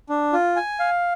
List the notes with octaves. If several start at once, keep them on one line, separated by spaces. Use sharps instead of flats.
D4
F4
G#5
F5